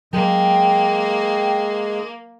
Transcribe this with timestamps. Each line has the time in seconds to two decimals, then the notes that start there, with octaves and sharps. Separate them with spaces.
0.13 F#3 G#3 A#3 G#4 G5